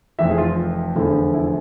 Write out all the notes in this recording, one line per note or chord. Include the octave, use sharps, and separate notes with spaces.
F1 F2 E3 E5
G#4
F4
F1 E2 D3 F3
E4